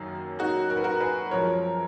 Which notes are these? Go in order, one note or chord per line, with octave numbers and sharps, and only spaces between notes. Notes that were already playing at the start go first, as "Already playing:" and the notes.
Already playing: F#2 D#3 F#3 A#3 D#4
D#4 F#4
A#4
B4
F#4 A#4
A#4
G#4 B4
F#2 F3 G#3 A#4 C#5